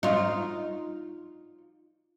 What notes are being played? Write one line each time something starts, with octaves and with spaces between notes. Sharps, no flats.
D#4 F4